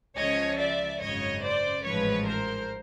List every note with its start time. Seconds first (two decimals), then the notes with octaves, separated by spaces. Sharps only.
0.16 C#2 C#3 F3 C#5 D#5
0.58 D5 E5
1.00 G#1 F#2 C#3 C#5 D#5
1.42 C5 D5
1.84 A1 G#2 F3 G#3 B4 C#5
2.26 A#4 C5